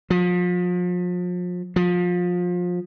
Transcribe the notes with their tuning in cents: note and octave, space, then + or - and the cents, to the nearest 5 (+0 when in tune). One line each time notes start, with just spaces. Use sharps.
F3 +35
F3 +25